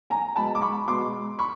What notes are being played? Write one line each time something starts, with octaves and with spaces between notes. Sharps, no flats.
G#5 A#5
B2 G#3 A5 B5
D6
B5 C#6
B2 G#3 C6 D6
B5 C#6